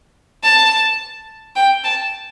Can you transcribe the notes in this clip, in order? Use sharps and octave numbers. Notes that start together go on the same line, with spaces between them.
A5
G5
A5